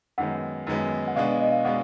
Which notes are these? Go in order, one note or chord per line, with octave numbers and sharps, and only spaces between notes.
F#2 D#3 G#3 B3 F#5
F#2 D#3 G#3 B3
F#5
B2 G#3 B3 D4 F5
F5
D#5
F5
B2 G#3 B3 D4 F#5